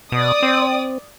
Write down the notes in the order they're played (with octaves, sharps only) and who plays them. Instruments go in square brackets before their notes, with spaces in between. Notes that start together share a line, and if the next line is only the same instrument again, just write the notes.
[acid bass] B2 [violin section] D5 D#6
[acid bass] C4